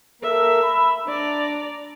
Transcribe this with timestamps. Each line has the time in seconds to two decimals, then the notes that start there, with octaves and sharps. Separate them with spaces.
0.23 A#3 A4 A#4 E5
0.62 B5
1.08 D4 D5 A#5